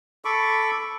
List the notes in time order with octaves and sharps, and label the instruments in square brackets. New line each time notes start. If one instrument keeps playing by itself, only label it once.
[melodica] A4 B5 C#6 D6